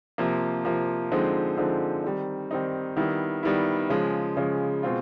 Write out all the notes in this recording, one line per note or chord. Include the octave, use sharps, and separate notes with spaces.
C3 F3 A#3
C3 F3 A#3
D3 F3 G#3 C4 D#4
D3 F3 G#3 C4 D#4
D#3 G3 C4 D#4
D#3 G3 C4 D#4
D#3 G3 B3 E4
D#3 G3 B3 E4
C#3 F3 G#3
C#3 F3 G#3
B2 G#3 C4 F4